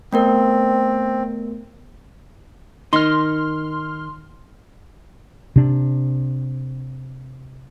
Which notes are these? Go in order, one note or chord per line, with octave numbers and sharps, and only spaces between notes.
A3 B3 C4 A#4
D#3 D#4 C6 F6
C3 D4